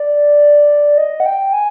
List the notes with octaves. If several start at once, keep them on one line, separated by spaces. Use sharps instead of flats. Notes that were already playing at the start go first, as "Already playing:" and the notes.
Already playing: D5
D#5
F#5
G5
G#5